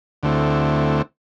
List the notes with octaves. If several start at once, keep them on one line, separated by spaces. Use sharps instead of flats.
D2 D3 A3 C4 E4